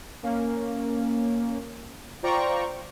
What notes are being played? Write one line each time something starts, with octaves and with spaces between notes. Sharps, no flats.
A#3 C#4
F4 C5 D5 G5 A#5 C#6